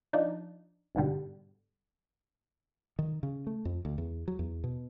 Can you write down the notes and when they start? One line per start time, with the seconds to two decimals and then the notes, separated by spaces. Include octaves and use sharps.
0.13 F3 D4 D#4
0.95 G1 G#2 B2 D3 G3
2.99 D#3
3.23 C#3
3.47 A3
3.65 F2
3.85 D2
3.98 E2
4.28 F#3
4.39 E2
4.64 B2